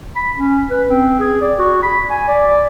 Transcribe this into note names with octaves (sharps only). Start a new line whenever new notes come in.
B5
C#4
B4
C4
G#4
D5
F#4
B5
G#5
D5